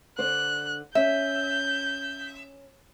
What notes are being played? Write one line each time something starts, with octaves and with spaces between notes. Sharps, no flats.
D3 C5 D5 F#6
C#4 E5 G6